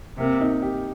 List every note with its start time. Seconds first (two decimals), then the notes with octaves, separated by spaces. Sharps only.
0.18 C3 A#3
0.41 D#4
0.62 G4